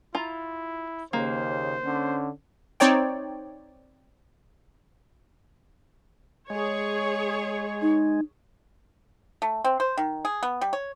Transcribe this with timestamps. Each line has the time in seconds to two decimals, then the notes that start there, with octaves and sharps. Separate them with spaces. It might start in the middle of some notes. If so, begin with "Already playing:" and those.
0.15 E4 F4 A#5
1.13 D#2 C#3 A#3 C5
1.85 D3 C#4
2.80 C4 D#4 C#5 D5 G5
6.50 G#3 G#4 C#5
7.82 D#4
9.42 A3
9.64 C4
9.80 C5
9.98 D#3
10.25 G#4
10.43 B3
10.61 G3
10.73 C#5